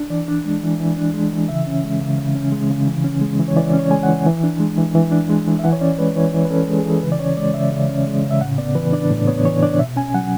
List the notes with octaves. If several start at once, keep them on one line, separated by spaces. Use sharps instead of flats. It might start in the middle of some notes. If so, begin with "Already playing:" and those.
Already playing: D4
E3 D5
D4
G#3
E3
E3
D4
G#3
E3
C#3 E5
C#4
G#3
C#3
C#3
C#4
G#3
C#3
E3
C#4
G#3
E3
C#5
E3 D5
C#4
C#5
G#3 G#5
F#5
E3
E3
D4
G#3
E3
E3
D4
G#3
E3
E5
E3 F#5
C#5
C#4 D5
G#3 B4
E3 C#5
E3
B4
C#4 A4
G#3 G#4
G#4
E3 A4
C#3 B4
D5
C#4 C#5
G#3 D5
C#3 E5
C#3
C#4
G#3
C#3
E5
A2 F#5
B3 D5
E3 B4
D4 D5
A2
B3 C#5
E3 C#5
D4 D5
B2 E5
C#4 G#5
F#3 F#5